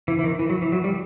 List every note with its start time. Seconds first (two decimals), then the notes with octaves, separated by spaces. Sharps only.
0.08 E3
0.19 E3
0.24 D#3
0.39 E3
0.50 F#3
0.62 E3
0.72 F#3
0.84 G3